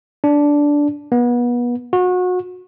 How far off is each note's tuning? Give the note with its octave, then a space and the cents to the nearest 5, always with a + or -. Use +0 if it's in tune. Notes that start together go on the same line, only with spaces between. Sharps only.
D4 -10
B3 -30
F#4 -30